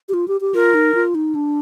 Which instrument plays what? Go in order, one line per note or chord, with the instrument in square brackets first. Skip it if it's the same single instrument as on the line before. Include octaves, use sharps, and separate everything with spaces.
[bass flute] G4
F4
G4
G4
[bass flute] F4 [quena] A#4
[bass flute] D#4
F4
D#4
D4